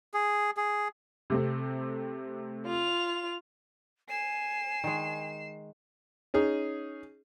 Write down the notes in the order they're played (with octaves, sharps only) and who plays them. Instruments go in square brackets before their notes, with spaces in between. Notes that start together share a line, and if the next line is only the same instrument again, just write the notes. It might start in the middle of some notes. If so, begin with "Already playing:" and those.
[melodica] G#4
G#4
[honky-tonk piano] C3 A3 C4
[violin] F4 F7
[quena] G#5 [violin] C7 E7
[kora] D#3 G#3
[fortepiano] C#4 D#4 G#4